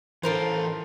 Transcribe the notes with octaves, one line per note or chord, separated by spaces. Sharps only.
E3 F4 A4 A#4 C5